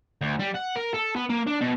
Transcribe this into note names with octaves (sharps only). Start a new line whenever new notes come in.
D2
G3
F#5
A#4
A4
B3
A#3
D4
B2